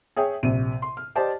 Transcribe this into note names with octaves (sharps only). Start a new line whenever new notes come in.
G#4 C#5 E5 G5
A#1 C3 D#7
C6
F6
G4 C5 D5 D#5 A5